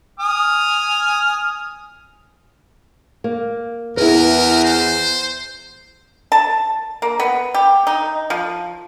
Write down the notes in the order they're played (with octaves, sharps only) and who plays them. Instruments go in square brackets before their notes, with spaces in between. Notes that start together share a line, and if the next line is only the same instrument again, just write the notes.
[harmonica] G#5 D#6 F6
[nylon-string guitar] A#3
[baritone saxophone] E2 [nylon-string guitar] E4 G#4 B4 [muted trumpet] A#4
[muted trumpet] C5
[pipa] A5
A#3
B3
G4
D#4
F3